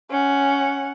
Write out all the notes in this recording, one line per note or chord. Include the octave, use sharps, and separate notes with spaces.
C#4 F#5